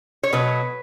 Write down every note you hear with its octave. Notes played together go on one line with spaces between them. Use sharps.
C#5
B2 F#3 B4